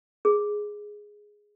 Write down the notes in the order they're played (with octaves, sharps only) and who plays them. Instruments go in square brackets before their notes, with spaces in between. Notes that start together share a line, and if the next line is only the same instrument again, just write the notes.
[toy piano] G#4